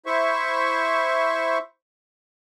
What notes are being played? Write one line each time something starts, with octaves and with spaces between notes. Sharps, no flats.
E4 C5 E5 C#6